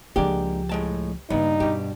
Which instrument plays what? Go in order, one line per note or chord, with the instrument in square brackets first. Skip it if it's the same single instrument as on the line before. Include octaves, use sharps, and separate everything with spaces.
[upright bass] C#2 F3 [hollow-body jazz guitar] G#3 A#3 D4 [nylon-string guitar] G4
[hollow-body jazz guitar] A2 G#3 A5
[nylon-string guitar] G2 [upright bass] C#3 A#3 [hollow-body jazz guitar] B3 [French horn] D#4
[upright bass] D2 [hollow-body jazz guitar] B2 G4